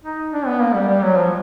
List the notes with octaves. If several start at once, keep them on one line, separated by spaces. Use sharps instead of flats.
D#4
D4
B3
A#3
G3
G3
F#3
F3